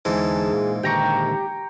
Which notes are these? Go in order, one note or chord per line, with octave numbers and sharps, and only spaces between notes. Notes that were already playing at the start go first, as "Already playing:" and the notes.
E2 G#2 D3 E3 G#4 A5
A#2 F4
A#2 D3 D#3 G4 G5 A#5 C#6